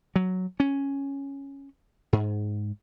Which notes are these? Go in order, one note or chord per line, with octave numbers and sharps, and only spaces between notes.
F#3
C#4
G#2